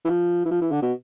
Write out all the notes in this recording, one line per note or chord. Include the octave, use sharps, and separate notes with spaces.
E3
F3
E3
F3
E3
D3
B2